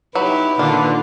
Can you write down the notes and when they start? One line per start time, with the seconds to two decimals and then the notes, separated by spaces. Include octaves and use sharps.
0.15 F#3 D#4 E4 G4 B4
0.59 A#2 D3 D#3 A#3 F4